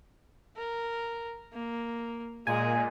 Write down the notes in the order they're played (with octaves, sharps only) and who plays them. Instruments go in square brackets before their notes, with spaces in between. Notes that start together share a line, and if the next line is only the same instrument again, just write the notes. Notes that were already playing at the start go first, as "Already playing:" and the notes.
[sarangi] A#4
A#3
[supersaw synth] A#2 [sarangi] G#3 [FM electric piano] G#5